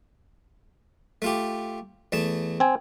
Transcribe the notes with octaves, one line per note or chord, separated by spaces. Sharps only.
A3 F4 G4
E2 A3 A5
C4 G#5